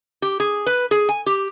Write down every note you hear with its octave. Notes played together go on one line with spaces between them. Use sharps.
G4
G#4
B4
G#4
G#5
G4